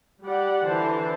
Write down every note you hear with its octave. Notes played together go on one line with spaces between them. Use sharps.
G3 G4 D5 F#5
D3 E3 C5 A5